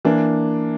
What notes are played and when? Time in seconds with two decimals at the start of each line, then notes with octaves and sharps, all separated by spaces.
0.05 E3 A#3 D4